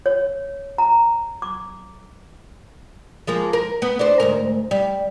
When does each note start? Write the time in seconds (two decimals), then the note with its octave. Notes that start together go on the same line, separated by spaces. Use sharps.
0.06 C#5
0.78 A#5
1.42 D6
3.27 F3 G#3 A#3
3.53 A#4
3.82 B3
3.99 D4 C5
4.20 D2 G#2 A#4
4.71 G3